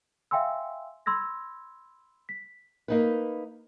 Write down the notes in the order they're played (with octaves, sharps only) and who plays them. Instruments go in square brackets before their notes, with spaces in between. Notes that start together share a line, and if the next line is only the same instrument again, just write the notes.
[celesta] E5 F5 G5 G#5 C6 E6
B5 C6 E6 G#6 A#6
B6
[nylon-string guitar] A#3 D#4 B4